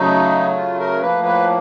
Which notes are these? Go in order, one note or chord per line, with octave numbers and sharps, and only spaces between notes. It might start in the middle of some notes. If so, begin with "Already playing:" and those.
Already playing: C#3 F#3 A3 D#4
F4
A#4
A2 F3 A#3 B4
B4